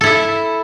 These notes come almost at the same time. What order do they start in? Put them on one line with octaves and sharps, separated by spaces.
A4 E4 E5